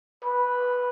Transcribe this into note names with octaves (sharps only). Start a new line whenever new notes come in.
B4